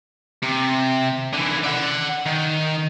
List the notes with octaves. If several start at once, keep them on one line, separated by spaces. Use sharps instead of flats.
C3
D3 E3
D5 F#5
D#3